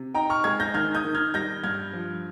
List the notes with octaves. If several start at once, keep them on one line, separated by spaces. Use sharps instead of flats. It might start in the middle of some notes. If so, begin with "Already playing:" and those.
Already playing: C3
D#4 G5 A#5
C#6 F6
G#3 F6 G#6
G6 A#6
D#3 F6 G#6
D#6 G6
D#3
F6 G#6
G3 G6 A#6
G2 F6 G#6
F3